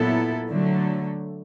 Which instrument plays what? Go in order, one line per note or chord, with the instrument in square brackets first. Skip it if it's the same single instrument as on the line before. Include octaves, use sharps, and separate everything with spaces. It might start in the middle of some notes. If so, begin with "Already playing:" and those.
Already playing: [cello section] A#2 F#3 B3 E4 A4
D3 F#3 A3